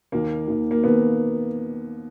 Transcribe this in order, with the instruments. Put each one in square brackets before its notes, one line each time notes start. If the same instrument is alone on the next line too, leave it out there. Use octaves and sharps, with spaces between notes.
[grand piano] D#2 D#3 A#3
D#2 D#3
A#3
D#2 D#3 B3